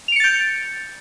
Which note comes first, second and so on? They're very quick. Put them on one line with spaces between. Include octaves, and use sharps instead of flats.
F7 D7 C#7 A6 G6